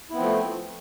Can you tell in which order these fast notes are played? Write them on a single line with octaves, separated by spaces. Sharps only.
E4 B3 C4 F3 A3